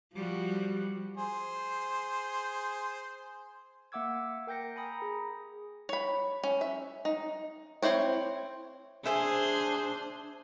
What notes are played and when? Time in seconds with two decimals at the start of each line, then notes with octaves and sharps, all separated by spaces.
0.14 F3 G3 F#4
1.17 G#4 C5
3.92 A#3 E5 F#5 D6 E6 G#6
4.47 A#4 G5 G6 A#6 C#7
4.76 G#5 A#5 B5 D#6 A#6
5.02 G#4
5.89 C#5 B5
6.44 C#4
6.61 E5
7.05 D#4
7.82 C4 D#4 E4 C5 C#5
9.05 D4 G#4 C5 E5 G#5 D#6